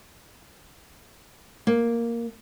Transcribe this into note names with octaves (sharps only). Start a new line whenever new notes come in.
A#3